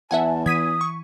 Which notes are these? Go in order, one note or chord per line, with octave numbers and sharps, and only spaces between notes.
E2 E5 F#5 G#5 A5
E3 D#6 G#6 B6 D#7
C#6